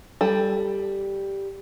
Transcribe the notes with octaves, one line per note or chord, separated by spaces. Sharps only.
G3 A4